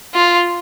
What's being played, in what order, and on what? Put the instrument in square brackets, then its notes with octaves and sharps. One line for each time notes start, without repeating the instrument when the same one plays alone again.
[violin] F4